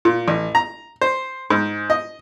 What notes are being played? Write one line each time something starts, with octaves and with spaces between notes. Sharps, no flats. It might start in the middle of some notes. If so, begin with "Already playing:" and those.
A#2
A1
A#5
C5
G#2
D#5